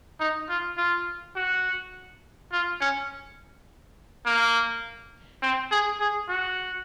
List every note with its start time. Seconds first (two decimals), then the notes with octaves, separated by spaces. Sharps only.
0.20 D#4
0.49 F4
0.78 F4
1.36 F#4
2.52 F4
2.81 C#4
4.26 A#3
5.42 C4
5.71 G#4
6.00 G#4
6.29 F#4